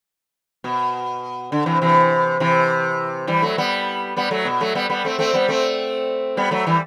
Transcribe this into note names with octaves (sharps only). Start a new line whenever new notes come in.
B2
D3
C3 E3
C3 E3
C3 E3
E3 G3
F#3 A3
G3 B3
G3 B3
F#3 A3
B2
F#3 A3
G3 B3
G3 B3
A3 C4
A3 C4
G3 B3
A3 C4
G3 B3
F#3 A3
E3 G3